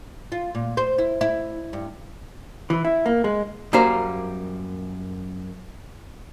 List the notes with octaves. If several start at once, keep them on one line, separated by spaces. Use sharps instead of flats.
F4
A#2
C5
E4
E4
G2
E3
E4
A#3
G#3
F#2 G3 A#3 C5 F5 A#5